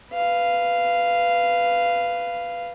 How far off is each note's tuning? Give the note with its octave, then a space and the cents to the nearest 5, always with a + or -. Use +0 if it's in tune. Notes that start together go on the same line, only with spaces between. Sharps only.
B4 +0 F5 -10